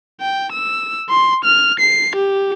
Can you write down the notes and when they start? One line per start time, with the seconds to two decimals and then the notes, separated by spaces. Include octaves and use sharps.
0.21 G5
0.52 E6
1.09 C6
1.44 F6
1.79 C7
2.15 G4